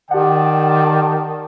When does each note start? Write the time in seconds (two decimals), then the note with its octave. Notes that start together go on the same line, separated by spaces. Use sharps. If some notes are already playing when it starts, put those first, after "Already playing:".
0.11 D#3 G4 D5 F#5 G5 A5